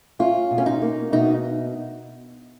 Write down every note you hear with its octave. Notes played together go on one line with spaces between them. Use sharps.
C#4 F4
B2
C#4
D#4
A#3
B2 D#4